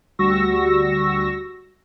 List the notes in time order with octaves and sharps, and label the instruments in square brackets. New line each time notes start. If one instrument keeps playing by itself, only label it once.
[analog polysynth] D2 G3 F#4 C#6 E6 A#6